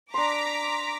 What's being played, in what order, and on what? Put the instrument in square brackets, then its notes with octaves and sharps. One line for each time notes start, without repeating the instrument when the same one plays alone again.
[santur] D4 C6 [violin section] A#5 D6 B6